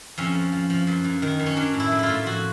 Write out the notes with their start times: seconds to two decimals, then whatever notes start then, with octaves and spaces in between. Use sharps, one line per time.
0.18 F2 C#4
0.35 F3
0.52 F3
0.70 F3
0.87 F#2
1.04 F#2
1.22 D#3
1.39 F#2
1.46 C#4
1.57 F#3 D4
1.74 A2
1.80 E4
1.92 F#3
1.99 E4 F4
2.09 A2
2.26 F2 F#4